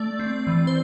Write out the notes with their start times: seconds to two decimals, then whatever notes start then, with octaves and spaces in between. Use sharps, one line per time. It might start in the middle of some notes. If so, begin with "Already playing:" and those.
Already playing: A3 D5
0.19 C4
0.47 E3
0.67 C5